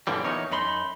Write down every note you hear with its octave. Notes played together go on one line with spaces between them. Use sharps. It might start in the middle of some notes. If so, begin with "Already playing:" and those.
F#2 A#2 D3 E3 G3
E2 D#4 A#4 C#5
F#2 D#4 B5 C6